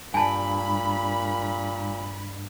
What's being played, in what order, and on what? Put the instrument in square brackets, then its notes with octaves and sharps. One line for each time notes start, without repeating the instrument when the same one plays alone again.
[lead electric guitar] G2 [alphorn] A#2 [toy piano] G#5 A5 [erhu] B5